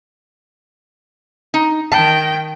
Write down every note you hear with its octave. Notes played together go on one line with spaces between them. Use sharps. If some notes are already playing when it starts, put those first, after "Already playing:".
D#4
D#3 G5 A5